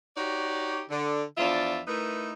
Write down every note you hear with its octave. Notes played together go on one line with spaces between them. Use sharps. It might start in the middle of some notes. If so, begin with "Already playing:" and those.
D#4 F#4 G4 C#5 D5
D3
E2 F3 D4 F4 E5
A3 D#4 E4 A#4 B4